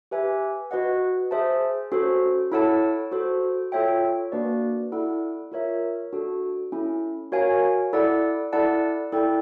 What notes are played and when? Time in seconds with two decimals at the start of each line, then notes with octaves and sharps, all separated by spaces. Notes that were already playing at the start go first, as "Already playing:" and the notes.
0.11 G4 B4 E5 G#5
0.71 F#4 B4 D#5 F#5
1.31 G#4 C5 E5 A5
1.92 C#4 F#4 A4 C5
2.52 E4 A4 C#5 F#5 A5
3.12 F#4 A4 C5
3.72 F4 A4 C#5 E5 G5
4.32 A#3 D4 F#4 B4 D5
4.92 E4 A4 D5 F#5
5.52 F4 A#4 C#5 E5
6.13 D4 F#4 A4
6.72 C#4 E4 A4
7.32 F#4 A#4 C#5 F5 G#5
7.93 E4 A4 D5 F#5
8.53 E4 A4 D5 F#5 A5
9.12 E4 A4 D5 G5